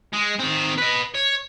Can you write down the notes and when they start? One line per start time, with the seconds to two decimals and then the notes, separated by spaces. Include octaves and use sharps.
0.13 G#3
0.39 D#3 C4
0.78 B4 D#5
1.14 C#5